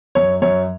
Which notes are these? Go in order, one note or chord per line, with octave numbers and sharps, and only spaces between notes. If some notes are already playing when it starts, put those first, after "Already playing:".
F#2 C#5
F#2 C#5